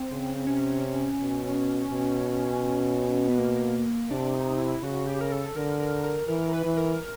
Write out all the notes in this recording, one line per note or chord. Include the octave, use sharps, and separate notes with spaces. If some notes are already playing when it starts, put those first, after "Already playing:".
Already playing: C4
C#3
C3 C#4
B2
B2
B3
A#3
C3 D4
D#4
E4
C#3 F#4
G4
A#4
A4
D3 A#4
A#4
A#4
E3 A#4
B4
E3
A#4